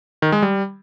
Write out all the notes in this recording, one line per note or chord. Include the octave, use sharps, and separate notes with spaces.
D#3
G#3
G3